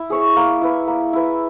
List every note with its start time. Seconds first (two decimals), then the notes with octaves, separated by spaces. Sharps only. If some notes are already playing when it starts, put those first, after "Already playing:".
Already playing: E4
0.10 G#4 C#5 E5
0.36 A#3
0.61 E4 B4
0.87 A#3
1.13 E4 B4